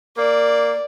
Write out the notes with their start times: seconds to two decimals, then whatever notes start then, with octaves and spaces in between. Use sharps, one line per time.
0.18 A#3 D5